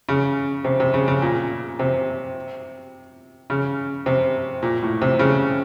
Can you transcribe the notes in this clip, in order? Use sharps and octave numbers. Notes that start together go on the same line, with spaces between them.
C#3
C3
C3
C#3
C#3
A#2
C3
C#3
C3
A#2
A2
C3
C#3